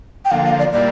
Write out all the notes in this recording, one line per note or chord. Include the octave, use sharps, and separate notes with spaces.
G5
D3 F3 A#3 F5
F5
D5
A#2 G3 A#3 E4 D5